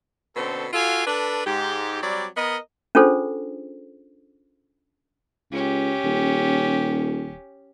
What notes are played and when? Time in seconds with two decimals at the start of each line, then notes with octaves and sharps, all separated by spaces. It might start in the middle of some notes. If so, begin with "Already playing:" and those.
0.36 B2 D3 C4 C#4 A4
0.72 F4 F#4 A4 F5 G#5
1.07 D4 A4 B4
1.46 G#2 G4
2.02 F#3 G3 C4 D5
2.37 B3 A#4 D#5
2.95 C#4 D4 F4 G#4 A4 C5
5.52 C#2 C#4 G4
6.05 D#1